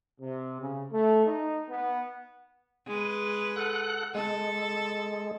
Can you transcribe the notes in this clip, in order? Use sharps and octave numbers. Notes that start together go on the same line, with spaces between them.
C3
C#3
A3
D#4
B3
G#3 B4
A4 F#5 F#6
G#3 A4